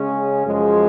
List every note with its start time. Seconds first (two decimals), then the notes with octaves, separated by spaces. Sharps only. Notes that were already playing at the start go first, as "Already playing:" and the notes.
Already playing: C#3 G#3 C#4
0.46 F#2 F3 G#3